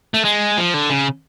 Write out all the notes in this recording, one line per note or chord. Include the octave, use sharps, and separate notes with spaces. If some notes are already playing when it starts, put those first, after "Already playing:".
A3
G#3
F3
D3
C#3